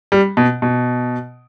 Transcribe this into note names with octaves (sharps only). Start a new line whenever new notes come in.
G3
B2
B2